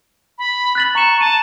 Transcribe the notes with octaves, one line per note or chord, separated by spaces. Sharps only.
B5
F#6 A6 F#7
A#5 C#6 E7
A5 D#7